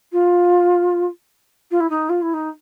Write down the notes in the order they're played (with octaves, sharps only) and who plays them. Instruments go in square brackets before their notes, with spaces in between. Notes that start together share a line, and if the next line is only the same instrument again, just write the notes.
[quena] F4
F4
E4
D#4
F4
E4
D#4